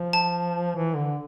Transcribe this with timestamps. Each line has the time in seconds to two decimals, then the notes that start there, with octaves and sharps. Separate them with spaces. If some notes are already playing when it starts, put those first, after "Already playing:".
Already playing: F3
0.13 A5
0.76 E3
0.96 D3